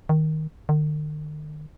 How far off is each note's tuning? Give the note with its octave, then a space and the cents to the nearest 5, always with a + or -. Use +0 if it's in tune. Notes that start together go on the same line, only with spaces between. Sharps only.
D#3 +5
D#3 -45